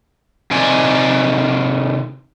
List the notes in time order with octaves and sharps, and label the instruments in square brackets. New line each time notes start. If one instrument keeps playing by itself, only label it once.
[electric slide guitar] C3 D#3 D5 G#5